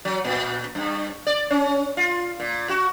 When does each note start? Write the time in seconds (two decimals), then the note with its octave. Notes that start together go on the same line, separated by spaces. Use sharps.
0.05 F#3
0.24 A#2
0.75 G2
1.27 D5
1.50 C#4
1.97 F4
2.40 A#2
2.69 F#4